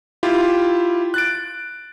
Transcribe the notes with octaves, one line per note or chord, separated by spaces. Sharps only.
E4 F4 G4
F#6 A6 D7